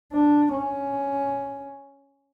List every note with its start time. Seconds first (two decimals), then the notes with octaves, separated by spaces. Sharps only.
0.12 D4
0.53 C#4